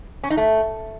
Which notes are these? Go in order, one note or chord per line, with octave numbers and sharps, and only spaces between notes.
C#4
D#4
A3